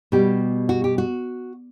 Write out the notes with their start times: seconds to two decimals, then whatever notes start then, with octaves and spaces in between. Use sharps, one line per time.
0.12 B2 G3 G4
0.69 F#4
0.84 G4
0.98 F#4